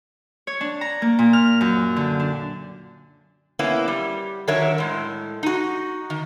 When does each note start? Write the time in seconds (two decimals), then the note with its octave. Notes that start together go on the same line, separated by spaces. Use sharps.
0.47 C#5
0.61 D4
0.81 A#5
1.02 A#3
1.19 A#2
1.33 F6
1.61 F#2
1.96 D3
2.20 D4
3.59 A#3 B3 C#4 E4
3.88 G3
4.48 D#3 F#3 D4 A#4 C#5 E5
4.78 A2 G#3
5.43 D#4 F#4
6.10 D#3